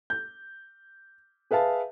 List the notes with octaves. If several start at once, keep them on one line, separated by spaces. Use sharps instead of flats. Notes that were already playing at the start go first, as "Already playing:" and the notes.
G6
G#4 B4 E5 F5 A5